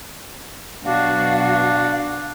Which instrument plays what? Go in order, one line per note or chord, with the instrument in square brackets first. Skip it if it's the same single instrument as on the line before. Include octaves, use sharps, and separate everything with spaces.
[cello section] B2 F#3 F#4 [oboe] D4 [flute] F5